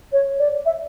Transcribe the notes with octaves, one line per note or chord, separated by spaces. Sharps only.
C#5
D5
E5